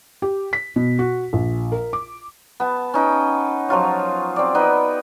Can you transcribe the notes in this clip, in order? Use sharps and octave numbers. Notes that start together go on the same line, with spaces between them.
G4
B6
B2
F#4
A#1
A#4
D6
B3 A5
C#4 D#4 B4 G5
F3 F#3 F4 C#5
C4 D5
B3 D#4 B4 G5